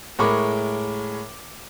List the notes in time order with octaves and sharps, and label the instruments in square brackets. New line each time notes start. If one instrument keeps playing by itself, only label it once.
[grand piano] A2 G#3 A#4 B5 C#6 D6